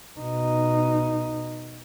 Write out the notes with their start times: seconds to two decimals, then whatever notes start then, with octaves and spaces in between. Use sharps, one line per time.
0.19 B2 D#4